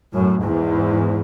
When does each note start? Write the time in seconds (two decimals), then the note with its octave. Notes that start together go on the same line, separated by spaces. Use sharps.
0.12 F#2 A2
0.43 E2 G#2